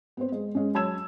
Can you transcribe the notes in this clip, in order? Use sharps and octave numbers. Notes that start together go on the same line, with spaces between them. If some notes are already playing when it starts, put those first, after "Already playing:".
B3 C4 C5
G#3
G#3 C#4
F#3 C#5 A5 E6 G#6 E7